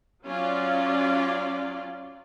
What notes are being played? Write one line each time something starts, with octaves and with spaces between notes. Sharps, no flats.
F#3 C#4 F4 D5